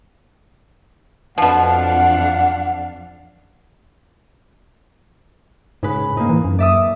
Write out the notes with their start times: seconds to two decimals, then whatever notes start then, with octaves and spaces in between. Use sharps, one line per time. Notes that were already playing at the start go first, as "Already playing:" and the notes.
1.38 F2 B2 F3 D4 F5 F#5
5.83 G#2 C#3 B4
6.17 G#2 A#3 D#4
6.29 E3
6.45 F#2
6.59 D5 E5 D#6